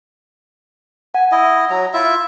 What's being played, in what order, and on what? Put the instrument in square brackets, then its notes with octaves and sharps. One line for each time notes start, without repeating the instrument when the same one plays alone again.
[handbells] F#5 [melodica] G#5
[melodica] E4 D#5
F#3 A#5
E4 F4 E5